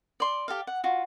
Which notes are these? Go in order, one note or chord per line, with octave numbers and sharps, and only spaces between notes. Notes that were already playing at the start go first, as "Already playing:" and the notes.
D5 C6
G4 A4 F5
F#5
F4 F#4